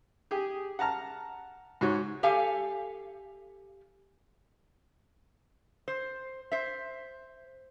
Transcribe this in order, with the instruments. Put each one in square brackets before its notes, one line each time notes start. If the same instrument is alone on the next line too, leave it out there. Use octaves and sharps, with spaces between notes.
[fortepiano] G4 G#4
F#5 A5 A#5 F6
G#2 F#4 C#5
[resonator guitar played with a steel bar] G4 A4 F5 G#5
C5
C5 E5